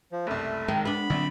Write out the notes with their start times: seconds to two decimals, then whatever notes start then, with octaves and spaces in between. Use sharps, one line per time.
0.12 F3
0.27 F#1 C2 A3
0.68 D#3 G#3
0.85 B3 D4 B5
1.10 A#1 D3 F#3 C4